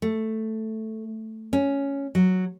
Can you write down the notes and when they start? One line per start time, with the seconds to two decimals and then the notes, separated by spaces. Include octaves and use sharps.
0.02 A3
1.53 C#4
2.15 F#3